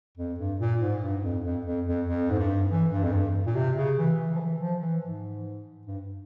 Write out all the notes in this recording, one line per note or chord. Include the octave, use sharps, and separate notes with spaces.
F2
G2
A#2
G#2
G2
F2
F2
F2
F2
F2
G#2
G2
E3
G2
F2
G2
A#2
C3
C#3
E3
E3
F3
E3
F3
E3
G#2
G2